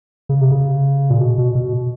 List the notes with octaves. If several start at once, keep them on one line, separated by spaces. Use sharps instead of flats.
C#3
C3
C#3
A#2
B2
B2
B2